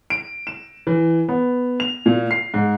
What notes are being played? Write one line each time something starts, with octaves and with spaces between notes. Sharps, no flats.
D7
E7
E3
B3
F7
A#2
C7
G#2